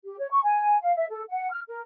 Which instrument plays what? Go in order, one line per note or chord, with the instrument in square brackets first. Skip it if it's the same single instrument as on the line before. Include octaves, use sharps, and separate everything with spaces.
[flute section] G4
C#5
C#6
G#5
F5
E5
A4
F#5
F6
A#4